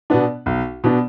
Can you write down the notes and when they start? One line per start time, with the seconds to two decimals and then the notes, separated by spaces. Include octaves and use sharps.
0.10 B2 B3 D4
0.46 B1
0.84 B2 B3 D4